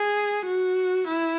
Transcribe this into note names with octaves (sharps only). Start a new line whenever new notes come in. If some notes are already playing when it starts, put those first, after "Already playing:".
Already playing: G#4
F#4
E4